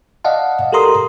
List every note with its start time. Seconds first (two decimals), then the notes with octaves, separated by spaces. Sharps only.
0.24 D5 D#5 F5 F#5 A5
0.72 G4 A4 A#4 A#5 C6 D#6